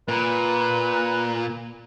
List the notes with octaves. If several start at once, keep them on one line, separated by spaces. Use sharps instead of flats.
A#2 B4